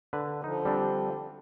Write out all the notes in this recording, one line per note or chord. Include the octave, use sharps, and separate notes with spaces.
D3 B4
D3 F3 D#4
G3 C4 D4